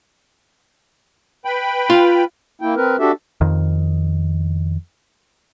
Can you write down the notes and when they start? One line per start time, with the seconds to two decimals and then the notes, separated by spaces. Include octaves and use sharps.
1.45 B4 G5 B5
1.90 F4
2.62 A#3 E4 G5
2.76 C4 A#4 B4
2.99 D4 F#4 G4 A4 E5
3.41 F2 D#3